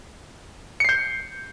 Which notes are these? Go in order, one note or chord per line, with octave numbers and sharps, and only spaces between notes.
G6 C7 C#7